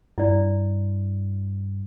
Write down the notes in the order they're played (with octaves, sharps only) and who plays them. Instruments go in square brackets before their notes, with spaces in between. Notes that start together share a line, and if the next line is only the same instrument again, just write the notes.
[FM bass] G2 [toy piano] E4 D5